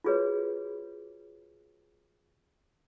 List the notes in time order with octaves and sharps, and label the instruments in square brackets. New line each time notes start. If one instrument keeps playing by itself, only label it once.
[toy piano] F4 F#4 G#4 B4 C#5